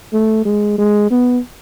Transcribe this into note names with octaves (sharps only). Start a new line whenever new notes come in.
A3
G#3
G#3
B3